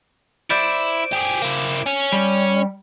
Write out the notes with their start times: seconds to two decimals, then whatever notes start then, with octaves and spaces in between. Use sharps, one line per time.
0.50 E4 C5 D5
1.13 G4 G#4
1.42 A#3 E4
1.86 C#4
2.12 G3